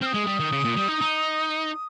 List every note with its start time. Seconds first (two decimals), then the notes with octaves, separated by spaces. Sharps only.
0.02 C4 F6
0.06 D#6
0.14 G#3
0.27 G3
0.40 D#3
0.52 C#3
0.64 A#2
0.77 G3
0.88 D#4
1.01 D#4